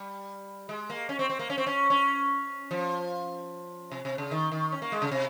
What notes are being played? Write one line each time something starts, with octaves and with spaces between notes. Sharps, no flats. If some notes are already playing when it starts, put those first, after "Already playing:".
Already playing: G3
G#3
A#3
C#4
C4
C4
A#3
C#4
C4
C#4
C#4
F3
C3
C3
C#3
D#3
D#3
C#4
A#3
G#3
C#3
C3